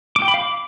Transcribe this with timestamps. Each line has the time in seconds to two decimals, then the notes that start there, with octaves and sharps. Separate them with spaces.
0.16 D6
0.22 G5
0.28 B5
0.34 F5
0.40 D6